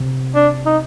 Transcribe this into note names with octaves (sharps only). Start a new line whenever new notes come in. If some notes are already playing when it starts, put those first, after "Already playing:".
Already playing: C3
D4
D#4